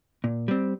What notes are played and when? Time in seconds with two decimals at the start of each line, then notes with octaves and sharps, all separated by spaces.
0.24 A#2
0.48 G3 C4